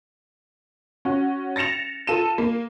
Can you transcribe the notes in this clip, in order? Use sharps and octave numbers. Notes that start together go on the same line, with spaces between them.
C#4 F#4
A6 A#6 C#7 E7 F7
F4 A4 D#7 E7
A#3